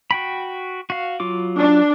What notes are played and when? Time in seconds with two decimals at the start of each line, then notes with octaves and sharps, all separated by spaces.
0.11 F#4 G5 B5
0.90 F#4 F5
1.20 F#3 F4 D6
1.57 D4